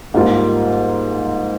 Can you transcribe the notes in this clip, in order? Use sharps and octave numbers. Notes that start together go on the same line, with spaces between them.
G#2 G3 A#3 F4